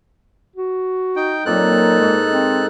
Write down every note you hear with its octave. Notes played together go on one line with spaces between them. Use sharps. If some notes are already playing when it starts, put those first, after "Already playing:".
F#4
D#4 G5
A#2 F#3 C4 D#4 A4 G5 F#6
G#2 G#3
C4